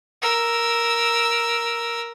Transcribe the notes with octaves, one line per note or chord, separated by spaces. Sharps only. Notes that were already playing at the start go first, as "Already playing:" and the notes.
A#4 E6